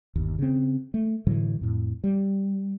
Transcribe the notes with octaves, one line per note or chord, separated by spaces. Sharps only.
G1 D#2
C#3 C4
A3
A2 D3 E3 F#3
F2 A2
G3